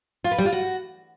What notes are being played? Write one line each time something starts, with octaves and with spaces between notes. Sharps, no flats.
F4
B4
G3
F4
F#4